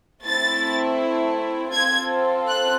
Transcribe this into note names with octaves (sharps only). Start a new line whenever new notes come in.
A3 C4 E4 A6
C4 F4 A4 G#6
F#6